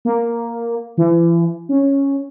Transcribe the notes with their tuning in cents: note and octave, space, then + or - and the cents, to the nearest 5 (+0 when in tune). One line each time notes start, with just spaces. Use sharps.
A#3 +0
E3 +35
C#4 -5